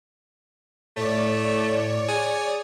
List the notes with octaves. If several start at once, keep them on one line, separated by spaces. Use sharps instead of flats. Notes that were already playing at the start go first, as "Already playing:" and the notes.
A2 A3 C#5 D5
G#4